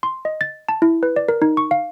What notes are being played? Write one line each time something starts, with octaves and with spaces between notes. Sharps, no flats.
C6
D#5
A6
A5
E4
B4
D5
A#4
D#4
C#6
F5